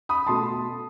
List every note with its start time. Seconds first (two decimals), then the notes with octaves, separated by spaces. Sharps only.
0.09 B5 D#6
0.27 B2 A3 A5 C6